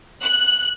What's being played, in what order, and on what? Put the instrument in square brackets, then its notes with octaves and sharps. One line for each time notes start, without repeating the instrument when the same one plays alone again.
[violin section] F#6